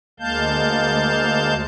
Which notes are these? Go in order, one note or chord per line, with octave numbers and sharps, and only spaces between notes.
D2 G#3 A#3 F5 A5 G6